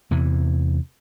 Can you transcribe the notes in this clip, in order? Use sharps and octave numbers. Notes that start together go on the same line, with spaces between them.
E2 C3 E3